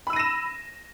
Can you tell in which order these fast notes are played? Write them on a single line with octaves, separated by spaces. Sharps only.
B5 E6 D#7 A#6 E7